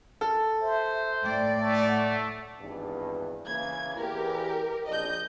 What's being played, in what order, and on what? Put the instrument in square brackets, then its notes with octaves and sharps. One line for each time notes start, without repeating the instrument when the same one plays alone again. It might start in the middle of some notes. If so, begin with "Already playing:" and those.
[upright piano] A4
[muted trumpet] C5 [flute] E5
[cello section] A2 D5 [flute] G5
[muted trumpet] A3
[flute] F#5
[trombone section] G#1 E2 G2
[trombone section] C#3 E3 A#3 [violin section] G#6
[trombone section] E2 E3 [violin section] G4 A#4
[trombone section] A#1 D4 [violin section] D#5 G6